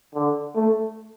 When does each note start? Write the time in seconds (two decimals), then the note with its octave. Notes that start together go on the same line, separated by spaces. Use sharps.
0.14 D3
0.55 A3